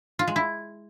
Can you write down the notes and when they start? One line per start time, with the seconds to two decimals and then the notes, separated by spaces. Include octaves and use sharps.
0.19 F4
0.28 G#3
0.36 E4